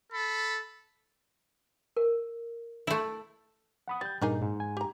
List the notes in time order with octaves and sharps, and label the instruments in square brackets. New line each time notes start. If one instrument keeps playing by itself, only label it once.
[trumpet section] A4 B5
[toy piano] A#4
[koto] A3 E4
[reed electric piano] F#5 B5 D#6
[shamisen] G3 [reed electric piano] G6 A6
[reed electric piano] G2 A#2 [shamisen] A#3 D#4 G#4
[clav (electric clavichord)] G#2
[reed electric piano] G#5
[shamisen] G4 A#5